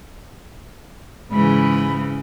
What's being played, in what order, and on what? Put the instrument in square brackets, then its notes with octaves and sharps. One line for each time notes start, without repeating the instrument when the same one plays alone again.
[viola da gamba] G#2 C#3 E3 [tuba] G#3 [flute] B5